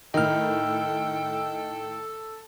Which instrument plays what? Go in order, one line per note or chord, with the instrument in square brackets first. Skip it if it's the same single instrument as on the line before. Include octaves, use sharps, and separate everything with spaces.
[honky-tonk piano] A2 D#3 [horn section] A4 [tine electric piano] D#5 F6 [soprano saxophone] G5